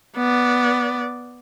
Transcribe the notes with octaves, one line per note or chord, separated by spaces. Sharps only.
B3 D5